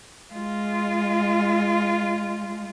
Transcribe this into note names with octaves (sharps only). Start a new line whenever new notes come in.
G#3 F4